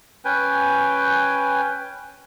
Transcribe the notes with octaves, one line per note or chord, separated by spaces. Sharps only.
C#4 B4 G5 G#5